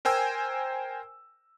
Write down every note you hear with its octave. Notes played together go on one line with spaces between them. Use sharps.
A#4 C5 G5 G#5 E6